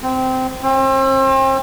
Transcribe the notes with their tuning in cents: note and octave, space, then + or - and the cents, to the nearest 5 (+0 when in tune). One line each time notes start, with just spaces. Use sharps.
C4 -15
C4 +40